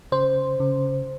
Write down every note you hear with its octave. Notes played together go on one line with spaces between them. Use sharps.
C#3 C5
C#3